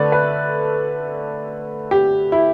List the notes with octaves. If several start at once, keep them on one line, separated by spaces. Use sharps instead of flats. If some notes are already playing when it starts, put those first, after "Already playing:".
Already playing: D3 A3 B4 D5
B4
G4
E4